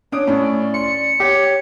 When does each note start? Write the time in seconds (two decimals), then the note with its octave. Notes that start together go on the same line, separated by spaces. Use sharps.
0.12 C#4 D4 C#5 D#6 D7
0.27 A2 C#4 D5
0.74 C6 C#7
1.20 G4 C#5 D6